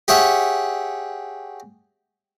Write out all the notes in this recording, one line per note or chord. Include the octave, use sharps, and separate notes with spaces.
G4 G#4 C#5 E5 F#5